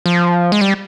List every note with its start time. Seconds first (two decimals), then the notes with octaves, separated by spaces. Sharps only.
0.06 F3
0.52 G#3
0.61 G3